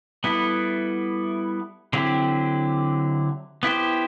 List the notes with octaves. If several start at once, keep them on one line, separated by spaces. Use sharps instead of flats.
G3 B3 E4 A4
D3 F#3 C4 E4 G4
B3 E4 G4 C5